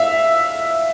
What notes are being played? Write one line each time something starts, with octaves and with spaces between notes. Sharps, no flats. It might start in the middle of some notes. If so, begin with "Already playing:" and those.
Already playing: E5 F5